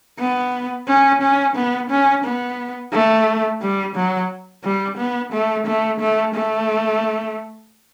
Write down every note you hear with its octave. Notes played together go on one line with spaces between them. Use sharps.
B3
C#4
C#4
B3
C#4
B3
A3
G3
F#3
G3
B3
A3
A3
A3
A3